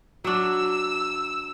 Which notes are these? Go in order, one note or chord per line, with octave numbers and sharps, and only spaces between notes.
F#3 D4 E6